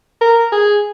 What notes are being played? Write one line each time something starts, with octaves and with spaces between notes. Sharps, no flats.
A#4
G#4